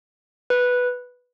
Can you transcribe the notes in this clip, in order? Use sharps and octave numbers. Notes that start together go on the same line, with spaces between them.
B4